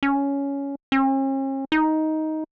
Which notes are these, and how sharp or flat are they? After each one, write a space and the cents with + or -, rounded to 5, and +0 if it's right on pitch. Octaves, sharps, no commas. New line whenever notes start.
C#4 +10
C#4 -45
D#4 +10